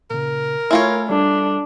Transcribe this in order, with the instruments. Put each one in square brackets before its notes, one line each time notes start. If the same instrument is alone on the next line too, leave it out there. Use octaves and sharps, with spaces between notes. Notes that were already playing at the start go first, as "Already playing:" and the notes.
[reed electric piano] A#2 C#3 [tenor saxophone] A#4
[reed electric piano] A3 G#5 [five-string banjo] E4 F4 C#5
[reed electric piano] G3 A4 [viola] D4